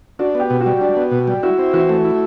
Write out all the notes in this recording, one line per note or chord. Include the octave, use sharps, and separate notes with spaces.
D4 F#4
B3 G4
B2
F#4
G3
D4
B3
B2
G3
E4 F#4
C4
E3 F#4
A3
E4